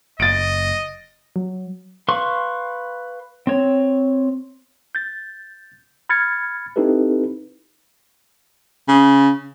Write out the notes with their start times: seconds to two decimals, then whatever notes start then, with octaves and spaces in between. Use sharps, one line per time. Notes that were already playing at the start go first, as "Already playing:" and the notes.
0.20 F#1 D#5 A6 D7
1.36 F#3
2.08 B4 F5 C6 C#6
3.47 C4 C#5
4.95 G6 A6
6.09 B5 F6 G#6 A6 C#7
6.76 C4 D#4 E4 G4 A4 B4
8.88 C#3